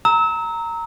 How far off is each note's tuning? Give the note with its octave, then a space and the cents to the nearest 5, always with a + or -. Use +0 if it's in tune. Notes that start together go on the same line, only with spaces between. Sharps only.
A#5 -10 E6 -35